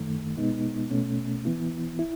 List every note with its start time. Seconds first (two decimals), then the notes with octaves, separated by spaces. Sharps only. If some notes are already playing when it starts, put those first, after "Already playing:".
Already playing: F#2 D#3 A3
0.37 B2 G#3 B3 D#4
0.90 B2 A3 C#4
1.45 E3 B3 E4
1.99 E4